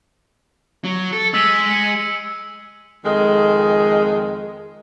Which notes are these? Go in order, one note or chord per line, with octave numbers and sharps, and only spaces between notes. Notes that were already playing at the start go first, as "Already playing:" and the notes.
F#3
A4
G#3 E6 B6 D#7
C#7
F2 D#3 G#3